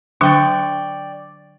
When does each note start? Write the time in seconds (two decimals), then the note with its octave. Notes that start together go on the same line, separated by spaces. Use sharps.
0.21 D3 F#3 D4 D5 G5 C#6